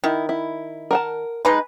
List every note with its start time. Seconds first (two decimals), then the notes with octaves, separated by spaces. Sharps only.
0.04 D#3 E4
0.29 E4
0.91 A#4 F#5 A5
1.45 G#3 D#4 B4